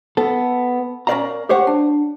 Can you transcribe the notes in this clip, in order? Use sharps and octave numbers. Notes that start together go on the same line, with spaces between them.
B3 A4
C#4 A#4 C5 D5 F5 A#5
G4 C5 C#5 F5 F#5
D4